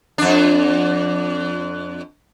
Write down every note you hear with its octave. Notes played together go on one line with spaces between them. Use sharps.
F2 D4